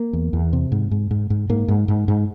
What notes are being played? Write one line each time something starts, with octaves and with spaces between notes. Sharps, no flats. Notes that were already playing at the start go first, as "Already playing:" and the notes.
Already playing: A#3
E2
E2
C3
G#2
G#2
G#2
G#2
G#2 A#3
G#2
G#2
G#2